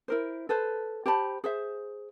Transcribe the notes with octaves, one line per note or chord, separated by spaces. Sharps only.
E4 A#4 C5
A4 B4 C5
G4 C5 A5 B5
G#4 C5 E5